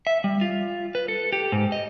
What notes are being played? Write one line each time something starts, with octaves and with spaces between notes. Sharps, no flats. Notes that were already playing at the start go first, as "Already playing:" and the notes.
E5
G3
F4
B4
A4
G4
G#2
D#5